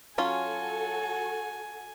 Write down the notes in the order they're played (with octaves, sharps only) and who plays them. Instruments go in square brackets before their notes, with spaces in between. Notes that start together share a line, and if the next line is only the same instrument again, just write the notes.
[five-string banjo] F#3 C#4 F4 [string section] F#4 A4 [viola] G#5